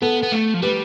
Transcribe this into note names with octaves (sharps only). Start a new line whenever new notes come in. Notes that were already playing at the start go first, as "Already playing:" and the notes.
B3 A4
B3
A3
F3
G3 B4